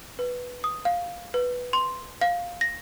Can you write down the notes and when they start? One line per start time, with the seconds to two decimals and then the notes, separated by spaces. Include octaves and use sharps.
0.19 B4
0.64 D#6
0.85 F5
1.34 B4
1.73 C6
2.21 F5
2.61 A#6